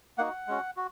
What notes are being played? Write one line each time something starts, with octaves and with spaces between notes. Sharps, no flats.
A#3 D#4 F#4 F#5
G#3 C#4 F#4
F#4